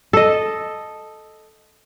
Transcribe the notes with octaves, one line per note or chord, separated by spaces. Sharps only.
A4 D#5